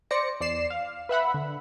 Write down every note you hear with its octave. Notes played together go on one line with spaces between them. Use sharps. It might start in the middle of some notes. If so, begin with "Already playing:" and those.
C5 D5 A#6 C#7
E2 D5 C7 E7
F5
B4 E5 F#5 B5
D3